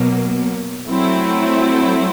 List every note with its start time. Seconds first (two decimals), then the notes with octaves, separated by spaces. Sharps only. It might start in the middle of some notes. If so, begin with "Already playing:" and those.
Already playing: B2 F#3 A#3
0.89 F#3 A3 C4 E4